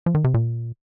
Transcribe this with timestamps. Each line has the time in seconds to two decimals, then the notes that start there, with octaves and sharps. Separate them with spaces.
0.06 F3
0.15 D#3
0.24 C3
0.34 A#2